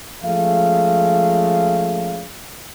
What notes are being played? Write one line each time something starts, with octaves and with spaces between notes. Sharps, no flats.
F3 G#3 A3 C#4 F5